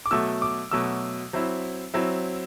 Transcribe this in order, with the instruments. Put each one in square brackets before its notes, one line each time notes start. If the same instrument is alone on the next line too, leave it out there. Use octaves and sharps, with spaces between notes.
[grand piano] D6
B2 F#3 A3 E6
D6
B2 F#3 A3 E6
F#3 C4 E4
F#3 C4 E4